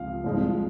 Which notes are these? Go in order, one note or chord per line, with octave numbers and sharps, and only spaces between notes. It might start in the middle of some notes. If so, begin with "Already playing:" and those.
Already playing: C#2 C3 F3 F5
C2 C3 F3 G#3